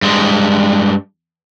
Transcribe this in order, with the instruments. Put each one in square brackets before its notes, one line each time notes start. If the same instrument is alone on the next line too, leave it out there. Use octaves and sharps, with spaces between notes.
[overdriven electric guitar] G2 G#3